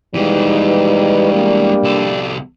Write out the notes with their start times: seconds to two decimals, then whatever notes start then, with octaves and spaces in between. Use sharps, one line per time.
0.14 D#2 E3 G3 G#3 D#4 B4
1.33 A#3 D4
1.83 C2 A4